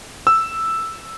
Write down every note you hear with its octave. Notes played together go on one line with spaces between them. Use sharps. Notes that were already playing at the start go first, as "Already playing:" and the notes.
E6